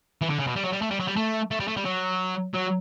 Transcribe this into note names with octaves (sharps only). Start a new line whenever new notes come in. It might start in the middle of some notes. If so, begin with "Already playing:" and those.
E3
D3
C#3
B2
G3
F#3
G3
A3
G3
F#3
G3
A3
A3
G3
A3
G3
F#3
F#3